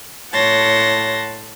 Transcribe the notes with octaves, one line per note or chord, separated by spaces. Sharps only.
A2 C#5 F#5 A5 C6 A#6